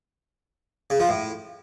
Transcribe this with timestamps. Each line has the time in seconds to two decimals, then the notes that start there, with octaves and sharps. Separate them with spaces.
0.90 C#3
1.00 F3
1.09 A2